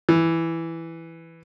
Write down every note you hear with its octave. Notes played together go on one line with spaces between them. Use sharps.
E3